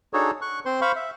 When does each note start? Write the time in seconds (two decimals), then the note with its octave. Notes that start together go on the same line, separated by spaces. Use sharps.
0.13 D4 D#4 F#4 G#4 A4 C#5
0.42 C#6 F#6
0.66 C4 C5 C6
0.81 C5 F5 B5 C#6
0.96 E5